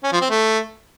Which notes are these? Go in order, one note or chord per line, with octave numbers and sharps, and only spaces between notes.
C#4
F3
C4
A3